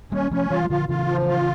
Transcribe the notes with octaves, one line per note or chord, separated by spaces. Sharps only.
G3 A#3 C#4
F3 A3 C#4
E3 G3 F4
G3
D3 F3 F4
C#3 E3 F4
F3
F4